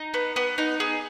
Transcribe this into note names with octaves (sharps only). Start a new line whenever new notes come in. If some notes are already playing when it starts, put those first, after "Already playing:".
Already playing: D#4
B3
B3
D#4
G#4